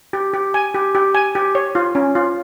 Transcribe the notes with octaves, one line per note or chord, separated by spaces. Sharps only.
G4
G4
G#5
G4
G4
G#5
G4
C#5
F4
C#4
F4